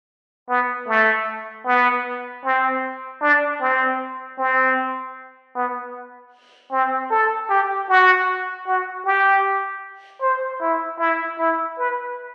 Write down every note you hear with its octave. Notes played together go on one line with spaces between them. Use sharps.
B3
A3
B3
C4
D4
C4
C4
B3
C4
A4
G4
F#4
F#4
G4
C5
E4
E4
E4
B4